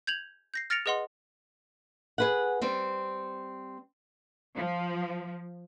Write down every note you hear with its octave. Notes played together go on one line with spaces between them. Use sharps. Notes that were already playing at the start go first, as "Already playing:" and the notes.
G6 G#6 F7 F#7
G6 A#6 C7
F6 A6 A#6 C#7 D7 F7
G#4 B4 D#5 F#5 C6
G#4 B4 F#5
G3 C4
F3